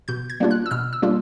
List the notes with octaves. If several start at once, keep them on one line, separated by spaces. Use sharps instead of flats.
B2 G6
G#6
G3 A#3 D4 F4
F#6
E6
B2 F6
E6
G3 A#3 D4 F4